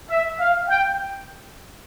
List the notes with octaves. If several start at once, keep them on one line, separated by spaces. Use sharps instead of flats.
E5
F5
G5